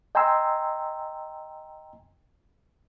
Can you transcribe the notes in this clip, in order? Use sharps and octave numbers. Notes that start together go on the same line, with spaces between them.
D#5 G5 G#5 A#5 C6 E6